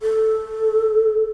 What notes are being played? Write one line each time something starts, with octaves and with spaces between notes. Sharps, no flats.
A4